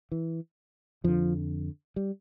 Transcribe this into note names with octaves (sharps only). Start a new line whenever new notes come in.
E3
F2 D3 F3
G3